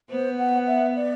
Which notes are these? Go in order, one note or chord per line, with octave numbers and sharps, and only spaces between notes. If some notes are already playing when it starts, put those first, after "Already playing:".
B3 C5
F#5
E5
D5